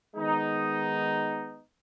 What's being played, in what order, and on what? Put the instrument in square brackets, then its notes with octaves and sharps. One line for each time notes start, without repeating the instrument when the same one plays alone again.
[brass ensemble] D#3 G#3 B3 D#4